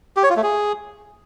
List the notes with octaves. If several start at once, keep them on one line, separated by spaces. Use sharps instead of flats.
G4
C#5
F4
A3
G#4